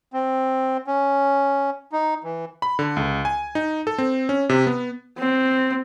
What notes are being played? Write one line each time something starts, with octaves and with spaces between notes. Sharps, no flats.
C4
C#4
D#4
E3
B5
D3
C#2
G#5
D#4
A4
C4
C#4
C3
B3
C4